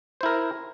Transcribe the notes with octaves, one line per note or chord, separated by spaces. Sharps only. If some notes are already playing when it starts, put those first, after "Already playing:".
E4 A#4 C5